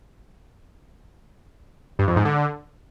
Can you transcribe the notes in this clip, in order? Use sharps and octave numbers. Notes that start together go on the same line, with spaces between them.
G2
F2
G#2
D3